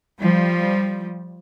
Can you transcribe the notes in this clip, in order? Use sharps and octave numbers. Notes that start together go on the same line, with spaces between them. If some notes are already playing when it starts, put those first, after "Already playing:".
F3 G3